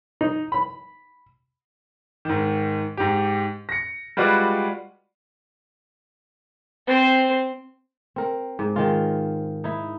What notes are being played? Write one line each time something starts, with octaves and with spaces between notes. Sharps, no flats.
D#4
B5
G#2 D#3
G#2 G4
A#6 C#7
G3 G#3 F4 F#4 B4 D5
C4 C5
C4 A#4
G#2
D#3 G#3 F4
D#4 E4